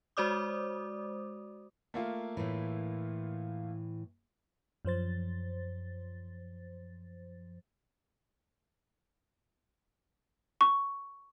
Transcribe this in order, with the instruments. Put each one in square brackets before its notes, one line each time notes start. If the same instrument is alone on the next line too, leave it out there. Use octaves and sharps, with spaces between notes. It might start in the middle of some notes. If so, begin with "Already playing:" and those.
[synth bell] G#3 F#4 C5 D5 D6 D#6
[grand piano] A3 A#3 F4
[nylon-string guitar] A2 E3
[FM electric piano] F#2 F3 C5 A6
[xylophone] C#6